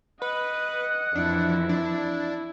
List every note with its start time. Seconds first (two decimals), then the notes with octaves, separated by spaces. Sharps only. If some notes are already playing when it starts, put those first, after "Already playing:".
0.22 B4 D#5 F#5
1.15 F2 E3 D4 E4
1.69 D4